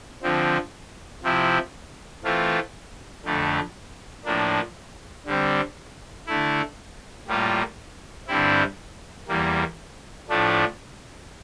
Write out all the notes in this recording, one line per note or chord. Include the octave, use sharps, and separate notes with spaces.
D3 F3 C4
C3 F3 C4 E4
E3 A3 C4 F4
F2 D3 A3
A2 F3 A#3 D4
D3 G3 C4
D3 A3 E4
A2 G3 A#3 F4
G2 D3 G3 C4 E4
E2 E3 G3 A#3
A2 F3 A3 D4